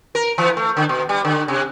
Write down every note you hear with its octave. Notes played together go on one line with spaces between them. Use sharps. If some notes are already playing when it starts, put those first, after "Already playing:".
A#4
E3
A3
D3
B2
G3
D3
C3